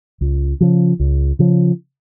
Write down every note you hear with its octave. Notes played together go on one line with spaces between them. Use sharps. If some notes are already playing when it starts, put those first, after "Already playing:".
C#2
C#3 F3
C#2
C#3 F3